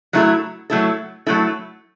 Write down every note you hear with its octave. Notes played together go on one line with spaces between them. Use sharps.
F#3 A3 E4 A4
F#3 A3 E4 A4
F#3 A3 E4 A4